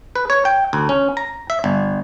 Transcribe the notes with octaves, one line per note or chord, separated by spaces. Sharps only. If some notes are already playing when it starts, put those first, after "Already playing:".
B4
C#5
G5
D2
C#4
A#5
E5
G1